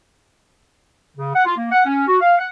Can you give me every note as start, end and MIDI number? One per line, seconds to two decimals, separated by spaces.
1.16 1.31 49
1.34 1.44 78
1.45 1.56 65
1.56 1.69 58
1.72 1.83 78
1.85 2.02 61
2.07 2.17 66
2.21 2.34 77
2.38 2.47 78